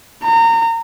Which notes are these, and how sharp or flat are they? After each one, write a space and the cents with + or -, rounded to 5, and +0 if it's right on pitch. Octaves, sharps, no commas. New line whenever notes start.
A#5 -30